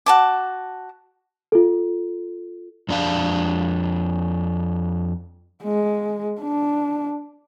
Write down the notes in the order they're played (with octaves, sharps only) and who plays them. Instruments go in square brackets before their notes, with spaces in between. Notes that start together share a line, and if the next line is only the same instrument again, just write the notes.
[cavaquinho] F#4 A5 D6
[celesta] F4 A4
[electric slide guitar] F2 D4 F5
[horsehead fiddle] G#3
D4